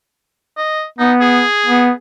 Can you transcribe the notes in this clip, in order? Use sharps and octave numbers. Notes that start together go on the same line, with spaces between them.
D#5
B3 D#4
G#4
B3